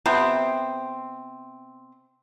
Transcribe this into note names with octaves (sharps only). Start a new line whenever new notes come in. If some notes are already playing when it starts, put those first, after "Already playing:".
C3 B3 C4